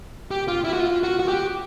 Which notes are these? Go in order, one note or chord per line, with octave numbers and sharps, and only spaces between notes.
G4
F4
E4
F#4
F4
F#4
F#4
G4